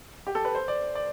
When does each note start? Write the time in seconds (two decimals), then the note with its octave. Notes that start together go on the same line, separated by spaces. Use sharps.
0.27 G4
0.35 A4
0.45 B4
0.55 C5
0.68 D5
0.95 D5